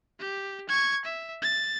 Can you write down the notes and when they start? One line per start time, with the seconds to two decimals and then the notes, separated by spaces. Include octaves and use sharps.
0.19 G4
0.69 C#6 G#6
1.05 E5
1.42 A6